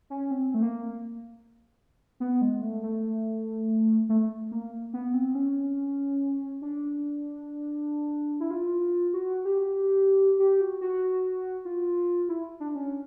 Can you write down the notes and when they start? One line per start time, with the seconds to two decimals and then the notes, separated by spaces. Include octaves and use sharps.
0.10 C#4
0.31 C4
0.54 A3
0.62 A#3
2.20 B3
2.42 G#3
2.62 A3
2.83 A3
4.09 A3
4.52 A#3
4.93 B3
5.14 C4
5.35 C#4
6.62 D4
8.40 E4
8.50 F4
9.14 F#4
9.45 G4
10.39 G4
10.61 F#4
10.81 F#4
11.65 F4
12.29 E4
12.60 D4
12.75 C#4